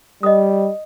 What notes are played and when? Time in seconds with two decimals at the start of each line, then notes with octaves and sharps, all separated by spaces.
0.23 G3 D#5 D#6